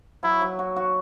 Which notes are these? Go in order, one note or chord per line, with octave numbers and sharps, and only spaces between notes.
F#3 E4
F#3
F#4
F#4